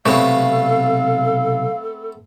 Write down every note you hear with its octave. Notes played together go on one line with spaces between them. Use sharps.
B1 C3 A3 B3 C4 A4 C#5 F5